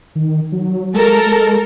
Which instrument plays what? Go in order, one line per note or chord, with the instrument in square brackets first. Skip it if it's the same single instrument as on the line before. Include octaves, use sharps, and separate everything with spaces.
[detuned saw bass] D#3
F#3
[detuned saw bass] G#3 [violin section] A4 A#4
[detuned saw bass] G#3